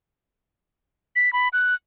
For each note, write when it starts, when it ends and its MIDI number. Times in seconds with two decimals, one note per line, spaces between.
1.16 1.32 95
1.33 1.48 83
1.53 1.75 90